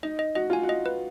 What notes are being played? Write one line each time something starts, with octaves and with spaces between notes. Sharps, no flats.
D#4 D#5
D#5
F#4 D#5
F4 G#5
F#4
D#5
B4